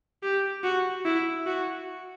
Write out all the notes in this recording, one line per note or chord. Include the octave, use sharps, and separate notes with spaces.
G4
F#4
E4
F#4